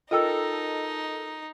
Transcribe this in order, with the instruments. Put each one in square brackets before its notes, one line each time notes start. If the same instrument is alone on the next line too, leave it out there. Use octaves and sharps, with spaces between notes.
[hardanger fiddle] D#4 [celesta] F4 G5 E6 [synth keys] A4 A#4 D#5